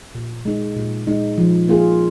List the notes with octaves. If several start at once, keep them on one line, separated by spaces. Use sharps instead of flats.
A#2
G#3 D#4
A#2
G#3 D#4
F3
A#3 F4 G#4